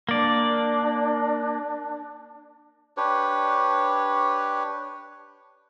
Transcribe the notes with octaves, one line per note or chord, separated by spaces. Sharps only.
A#3 D4 D5
D4 G4 B4 C#5